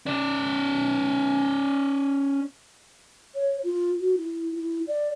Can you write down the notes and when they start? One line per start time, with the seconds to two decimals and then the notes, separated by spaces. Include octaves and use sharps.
0.06 C#4 D5
3.34 C#5
3.63 F4
4.00 F#4
4.17 E4
4.55 E4
4.87 D5